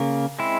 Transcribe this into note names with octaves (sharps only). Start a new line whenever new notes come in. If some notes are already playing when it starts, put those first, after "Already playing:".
Already playing: C#3 A#3
G#3 C4 E4